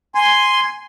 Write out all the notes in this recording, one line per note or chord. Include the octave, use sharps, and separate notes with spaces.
G#5 C6